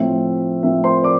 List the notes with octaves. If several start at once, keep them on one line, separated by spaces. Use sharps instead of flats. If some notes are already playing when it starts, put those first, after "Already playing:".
Already playing: A2 F3 C4 E5
A2 F3 C4 E5
C5 C6
D5 D6